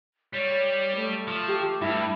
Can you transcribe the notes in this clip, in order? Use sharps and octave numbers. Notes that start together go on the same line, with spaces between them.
G3 C#5
A3
F3
G4
G2 E4